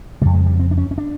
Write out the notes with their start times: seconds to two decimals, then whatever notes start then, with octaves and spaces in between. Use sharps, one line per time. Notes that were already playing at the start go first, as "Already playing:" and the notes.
0.21 F2 C#3 G3
0.34 G#3
0.46 G3
0.59 C4
0.71 D4
0.78 C#4
0.91 C#4
0.98 D4